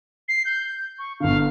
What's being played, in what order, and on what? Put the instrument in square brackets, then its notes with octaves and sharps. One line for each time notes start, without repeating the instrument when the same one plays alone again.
[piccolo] C7
G6
C#6
[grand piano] G1 D3 [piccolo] F5